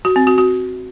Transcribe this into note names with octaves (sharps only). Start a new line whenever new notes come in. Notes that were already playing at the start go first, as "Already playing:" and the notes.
F#4
C4
F#4
F#4